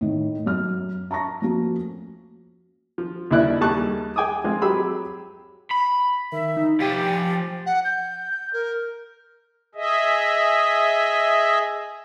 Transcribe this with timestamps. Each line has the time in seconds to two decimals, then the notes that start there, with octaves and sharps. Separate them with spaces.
0.01 A2 D#3
0.46 F#2 F6
1.11 A5 A#5 C#6 A#6
1.42 F3 A3 A#3 C#4 F#4
2.98 F3
3.31 D#2 C#3 E3 E4 D5 F#6
3.61 D#2 G3 G#4 A5 C#6 F#6
4.16 G#4 G5 G#5 D6 D#6
4.44 F3 G#3 C4 F4
4.62 F#3 G4 G#4 B5 E6
5.71 B5
6.32 D#3 E5
6.57 D#4
6.80 F3 G4 G#5 A6
7.66 F#5
7.84 G6
8.53 A#4
9.75 G#4 D#5 E5